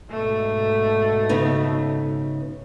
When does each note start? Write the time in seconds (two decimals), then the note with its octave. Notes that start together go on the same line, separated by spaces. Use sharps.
0.10 G#2 B2 A3
1.29 C#3 B3 D#4